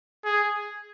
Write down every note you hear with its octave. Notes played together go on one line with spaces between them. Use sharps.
G#4